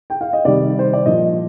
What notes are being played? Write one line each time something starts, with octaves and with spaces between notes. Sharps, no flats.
G5
F5
D#5
C3 D#3 G3 D5
C5
D5
A#2 F3 D#5